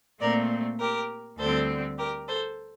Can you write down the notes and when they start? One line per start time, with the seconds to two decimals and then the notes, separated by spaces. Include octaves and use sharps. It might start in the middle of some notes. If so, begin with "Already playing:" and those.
0.20 A#2 A3 C4 A#4 D5
0.79 G4 A#4
1.38 D2 D3 G3 C4 A4 C5
1.98 G4 A#4
2.28 A4 C5